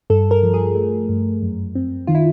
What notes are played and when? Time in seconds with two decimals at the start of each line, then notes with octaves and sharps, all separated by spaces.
0.10 G2 A4
0.31 A#4
0.43 F3
0.54 G#4
0.75 A3
1.09 G2
1.42 F#2
1.75 C4
2.07 D#3 F4
2.15 E4